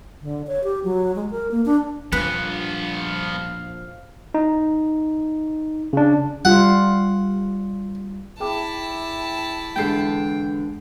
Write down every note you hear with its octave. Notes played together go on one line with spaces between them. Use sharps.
D3
C#5
G4
F#3
G#3
A#4
A#3
D4
A#1 G2 F3 B3 D4 B4 F5
D#4
C#3 D4
G3 F4 F#5
E4 G#4 G5 A5 D6
E2 D3 G#3 A4 G5 C7